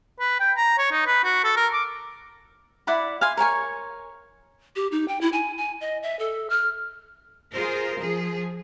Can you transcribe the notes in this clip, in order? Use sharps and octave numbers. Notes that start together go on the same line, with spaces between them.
B4
G5
A#5
C#5
D#4
B4
F#4
A4
A#4
D6
E4 D5 F#5 B5
F5 G#5 C6
A#4 C#5 G#5 C#6
G4
D#4
G5
E4
G#5
G#5
D#5
E5
A4
F6
F4 G#4 A#4 C5
F3 G#4